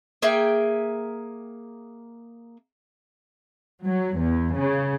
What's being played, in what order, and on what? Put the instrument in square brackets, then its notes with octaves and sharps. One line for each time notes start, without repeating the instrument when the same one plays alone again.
[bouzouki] A#3 G#4 E5 G5
[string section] F#3
E2
C#3